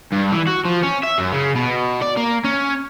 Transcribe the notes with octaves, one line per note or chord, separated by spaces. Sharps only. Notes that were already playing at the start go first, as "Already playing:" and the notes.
G2
E3
F#4
F3
C#4
E5
F#2
C#3
B2
D5
A#3
C#4